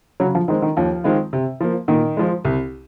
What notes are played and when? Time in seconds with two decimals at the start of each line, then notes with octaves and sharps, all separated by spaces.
0.20 C#3 F#3
0.35 F3
0.48 D#3 G#3 C4
0.62 D#3
0.77 D#2 F3
1.04 D#3 G#3 C4 F4
1.33 C3
1.60 F3 A#3
1.88 A#2 D#3
2.17 F3 G#3
2.45 C2